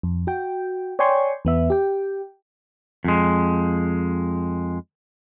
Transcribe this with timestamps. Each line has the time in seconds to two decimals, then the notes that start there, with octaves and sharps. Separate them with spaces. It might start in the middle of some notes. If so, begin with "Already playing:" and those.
0.03 F2
0.27 F#4 G5
0.99 C#5 D5 G5 G#5 C6 C#6
1.45 E2 B3 E5
1.70 G4 G5
3.04 F2 G#3